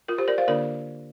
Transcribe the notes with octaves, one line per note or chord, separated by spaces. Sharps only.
F4 A#4
G4 C5
A#4 D5
C5 F5
D3 A#3 D4 F4 A#4 D5